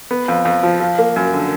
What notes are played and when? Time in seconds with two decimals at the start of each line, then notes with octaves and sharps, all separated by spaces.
0.11 B3
0.28 F2
0.45 F2
0.63 F3
0.80 F3
0.98 A#3
1.16 F#2
1.34 D3